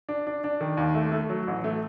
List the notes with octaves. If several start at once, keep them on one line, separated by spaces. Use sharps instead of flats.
D4
D4
D4
D#3
D#2
A3
A3
F#3
A1
A3